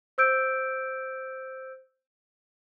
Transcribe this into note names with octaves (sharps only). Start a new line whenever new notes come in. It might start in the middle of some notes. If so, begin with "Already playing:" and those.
C5 E6 G6 D7